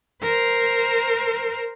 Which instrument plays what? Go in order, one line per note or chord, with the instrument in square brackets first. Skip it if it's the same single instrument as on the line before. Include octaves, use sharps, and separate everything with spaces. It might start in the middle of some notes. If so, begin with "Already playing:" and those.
[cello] A#4 C5